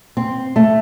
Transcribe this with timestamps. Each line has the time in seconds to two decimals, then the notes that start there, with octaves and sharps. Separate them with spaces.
0.17 C4
0.56 A3